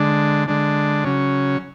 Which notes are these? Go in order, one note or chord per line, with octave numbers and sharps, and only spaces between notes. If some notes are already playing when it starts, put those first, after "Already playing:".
Already playing: D3 G#3 D4
D3 G#3 D4
C#3 F#3 C#4